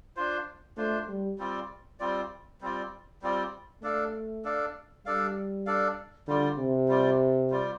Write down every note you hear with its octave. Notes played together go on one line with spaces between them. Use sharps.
D4 F4 C5
A3 D4 F4 C5
G3
G3 C4 F4 D5
G3 C4 F4 D5
G3 C4 F4 D5
G3 C4 F4 D5
A3 D4 A4 D5 F5
D4 A4 D5 F5
G3 D4 A4 D5 F5
D4 A4 D5 F5
D3 G3 F4 D5
C3
G3 F4 D5
G3 F4 D5